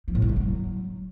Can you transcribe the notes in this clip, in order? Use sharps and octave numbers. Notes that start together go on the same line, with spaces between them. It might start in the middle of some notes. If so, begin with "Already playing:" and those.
F3
A2
G2
D3
F#3